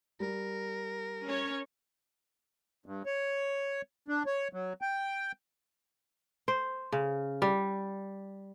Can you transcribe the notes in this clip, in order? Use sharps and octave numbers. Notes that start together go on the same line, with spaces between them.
G3 A#4
C#4 C#5
G2
C#5
D4
C#5
F#3
G5
C5
C#3
G3